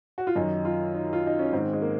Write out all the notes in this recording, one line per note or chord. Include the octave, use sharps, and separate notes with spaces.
F#4
F4
F#2 D#3 D#4
F4
D#4
F4
D#4
C#4
G#2 D#3 C4
G#3
A#3